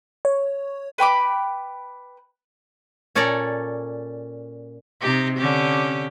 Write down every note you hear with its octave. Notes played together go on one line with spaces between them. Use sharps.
C#5
B4 G5 B5 D6
A#2 C#4 A4 C#5 D5 A#5
C3 D#4 G4
D3 C#4 G4